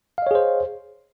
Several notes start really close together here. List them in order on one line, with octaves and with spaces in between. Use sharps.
F5 D#5 C#5 G#4 C5